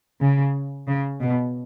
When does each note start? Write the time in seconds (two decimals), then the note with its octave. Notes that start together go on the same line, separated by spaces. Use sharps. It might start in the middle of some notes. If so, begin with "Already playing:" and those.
0.20 C#3
0.87 C#3
1.21 B2